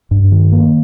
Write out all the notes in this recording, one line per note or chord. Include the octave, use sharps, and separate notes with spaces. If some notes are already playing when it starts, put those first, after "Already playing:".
G2
D#3
A#3